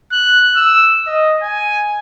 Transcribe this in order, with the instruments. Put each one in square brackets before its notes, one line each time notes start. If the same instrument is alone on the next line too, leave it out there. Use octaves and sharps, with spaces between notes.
[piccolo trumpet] F#6
E6
D#5
G#5